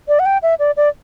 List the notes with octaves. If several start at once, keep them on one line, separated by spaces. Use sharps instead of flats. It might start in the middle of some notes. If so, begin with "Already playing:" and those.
D5
F#5
G5
E5
D5
D5